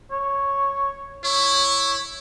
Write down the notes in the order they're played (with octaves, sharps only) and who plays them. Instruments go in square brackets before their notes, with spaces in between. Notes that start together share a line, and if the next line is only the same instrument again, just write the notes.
[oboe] C#5
[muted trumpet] E4 [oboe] C#5